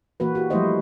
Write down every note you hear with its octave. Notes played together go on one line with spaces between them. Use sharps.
E3 A#3 F#4 B4
F#4 G4
F3 G3 A3 E4 C5 D#5